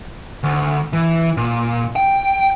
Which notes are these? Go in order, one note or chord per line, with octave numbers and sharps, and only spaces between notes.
D2
E3
A#2
G5